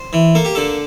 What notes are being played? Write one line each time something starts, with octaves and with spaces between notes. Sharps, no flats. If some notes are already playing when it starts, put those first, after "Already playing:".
Already playing: C5
E3
A#3 A4
G4
D3 A4